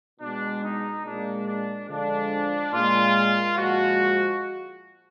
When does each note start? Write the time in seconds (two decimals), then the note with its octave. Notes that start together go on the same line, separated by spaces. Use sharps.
0.20 B2 G#3 D4
0.63 D#4
1.05 A#2 G#3 D4
1.47 D4
1.88 D3 F3 G#3 D4
2.73 A#2 G#3 F4
3.56 A#2 F3 G#3 F#4